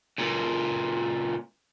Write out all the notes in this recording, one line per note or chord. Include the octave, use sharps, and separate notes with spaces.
C#2 A#2